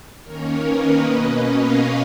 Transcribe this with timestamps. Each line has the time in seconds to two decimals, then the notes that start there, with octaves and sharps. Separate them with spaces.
0.24 D#3 A#3 C#4 A#4 C#5
0.64 B4 D#5
1.04 B2 A#3 C#4
1.44 C#5 F5